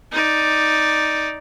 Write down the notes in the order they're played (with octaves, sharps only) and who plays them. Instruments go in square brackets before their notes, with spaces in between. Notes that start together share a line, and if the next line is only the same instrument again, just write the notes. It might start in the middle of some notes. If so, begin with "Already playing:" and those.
[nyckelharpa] D#4 D5